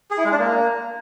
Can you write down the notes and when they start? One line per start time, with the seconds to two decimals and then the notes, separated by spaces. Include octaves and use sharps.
0.11 G#4
0.18 E4
0.25 G#3
0.32 D4
0.39 A#3